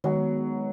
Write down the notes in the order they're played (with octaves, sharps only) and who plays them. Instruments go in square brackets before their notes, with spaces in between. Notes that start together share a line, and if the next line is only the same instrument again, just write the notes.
[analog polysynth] D#3 G#3 B3 [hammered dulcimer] F#3